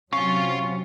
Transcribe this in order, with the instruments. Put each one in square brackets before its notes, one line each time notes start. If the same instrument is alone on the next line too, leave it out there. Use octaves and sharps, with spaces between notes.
[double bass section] C3 F#3 C4 [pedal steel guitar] C#4 [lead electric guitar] F4 F5 [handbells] C#6